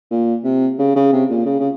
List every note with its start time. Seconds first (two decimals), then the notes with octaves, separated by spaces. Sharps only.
0.11 A#2
0.44 C3
0.79 C#3
0.96 C#3
1.12 C3
1.29 A#2
1.46 C#3
1.60 C#3